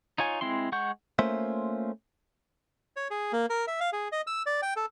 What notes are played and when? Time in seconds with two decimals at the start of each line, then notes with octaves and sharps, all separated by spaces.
0.18 D#4 F4 C#5 G#5
0.41 G#3 C4 E4 C6
0.72 G#3 F#5 C#6 G6
1.19 A3 A#3 C#4 F4 C5 E5
2.96 C#5
3.11 G#4
3.33 A#3
3.50 A#4
3.67 E5
3.80 F5
3.93 G#4
4.12 D#5
4.27 E6
4.46 D5
4.62 G5
4.76 A4